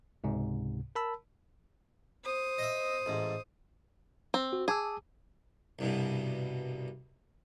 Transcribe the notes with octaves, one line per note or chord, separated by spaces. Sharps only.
C#2 G#2 C3
A#4 A5 B5 E6
C5 D#6
D#5 E5
A1 G#2
C4
F#4
G#4 A5 D6 E6
C2 G2 B2